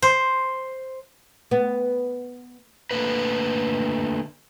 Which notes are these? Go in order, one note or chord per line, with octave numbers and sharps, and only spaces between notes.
C5
B3
D3 A3 A#3 A#4 B4